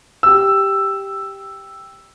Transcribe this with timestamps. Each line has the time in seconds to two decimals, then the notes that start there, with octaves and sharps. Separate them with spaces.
0.23 G4 E6